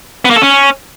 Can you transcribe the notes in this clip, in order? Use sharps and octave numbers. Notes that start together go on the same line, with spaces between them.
B3
A#3
A4
C#4